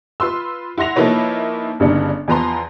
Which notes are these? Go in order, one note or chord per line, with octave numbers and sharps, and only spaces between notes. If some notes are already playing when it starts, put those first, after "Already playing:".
F4 B4 C6 E6
E4 F#5 C6 A#6 F7
F3 A#3 D#4 E4 B4 C#5
G1 C#3 D4 D#4
E2 F3 B4 A#5 C6